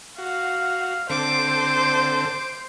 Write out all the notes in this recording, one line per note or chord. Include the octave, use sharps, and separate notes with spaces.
F#4 F5
D3 C4 A4 C5 D6